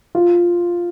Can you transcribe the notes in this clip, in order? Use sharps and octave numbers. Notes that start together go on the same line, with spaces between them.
F4